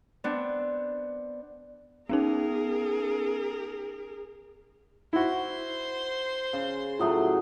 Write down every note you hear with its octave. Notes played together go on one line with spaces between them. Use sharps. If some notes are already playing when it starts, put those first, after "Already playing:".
B3 C4 D4
B3 C#4 D#4 G#4 A#4
E4 F#4 C5 C6
C#3
A2 F#3 A3 F4 D#6